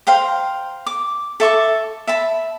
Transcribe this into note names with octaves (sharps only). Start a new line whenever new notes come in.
C5 F5 G5 A#5
D6
A4 E5 C#6 D6
E5 A5 B5